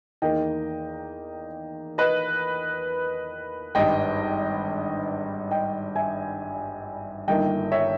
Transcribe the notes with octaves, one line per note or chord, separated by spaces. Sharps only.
E2 D#3 A#3 D#4 D#5 G5
B4 D#5
G#1 G2 G3 D#5 G5
D#5 G5
E5 G#5
G1 G2 D#3 A#3 D#4 D#5 G5
C#5 E5